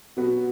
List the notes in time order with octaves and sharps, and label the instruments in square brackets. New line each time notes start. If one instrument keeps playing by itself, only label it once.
[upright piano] B2 F#3 B3 F#4